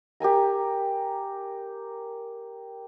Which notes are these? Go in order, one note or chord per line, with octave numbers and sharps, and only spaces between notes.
G4 A#4 G#5 A#5